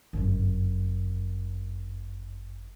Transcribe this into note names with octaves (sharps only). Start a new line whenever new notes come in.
G1 F#2